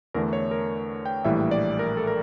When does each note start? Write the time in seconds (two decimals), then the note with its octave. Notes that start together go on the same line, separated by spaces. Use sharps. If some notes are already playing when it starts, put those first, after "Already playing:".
0.14 E2 D3 A3 D4 A#4
0.33 C#5
0.51 A#4
1.06 G5
1.25 A#1 A2 E3 G3 A#3 E5
1.51 D5
1.79 A#4
1.97 A4
2.07 A#4